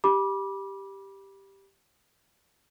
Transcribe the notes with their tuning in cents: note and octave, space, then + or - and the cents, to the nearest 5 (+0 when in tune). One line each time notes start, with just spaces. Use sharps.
G4 +0 B5 -25 D6 +0